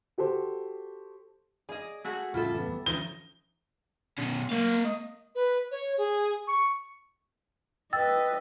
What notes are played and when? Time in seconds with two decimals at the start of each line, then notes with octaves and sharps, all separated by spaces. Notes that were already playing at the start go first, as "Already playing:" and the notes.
0.18 F#4 G4 A4 C5
1.69 G#4 D5 D#5
2.04 A3 F#4 G#4
2.34 F2 A2 C#3 G3 F4 A4 E5
2.54 E3 B3
2.86 D3 E3 F3 C#4 D#4 G7
4.18 B2 C#4
4.50 A3 A#3 F5
4.85 D#5
5.35 B4
5.71 C#5
5.98 G#4
6.48 C#6
7.93 B4 D#5 G5 E6 A6